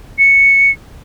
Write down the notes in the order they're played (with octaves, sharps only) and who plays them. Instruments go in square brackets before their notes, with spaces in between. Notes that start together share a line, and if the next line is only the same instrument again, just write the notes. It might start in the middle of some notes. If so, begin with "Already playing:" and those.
[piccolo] C#7